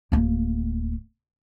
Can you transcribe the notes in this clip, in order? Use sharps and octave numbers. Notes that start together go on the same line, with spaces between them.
D1 A#3